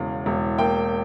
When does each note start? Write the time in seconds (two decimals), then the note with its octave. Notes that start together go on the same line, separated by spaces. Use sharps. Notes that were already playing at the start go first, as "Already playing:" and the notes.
Already playing: E1 E2 C#3 F5
0.26 E1
0.58 A#3 G5